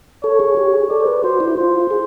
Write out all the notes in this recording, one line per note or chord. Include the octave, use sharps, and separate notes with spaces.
A4 C#5
G#4
G4
G#4
A4 D5
C5
B4
F#4 C5
E4
F4 C5
G#4